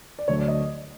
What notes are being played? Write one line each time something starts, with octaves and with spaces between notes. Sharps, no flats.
D5
D2 D3 F#3 A3 C#5
D5
D#5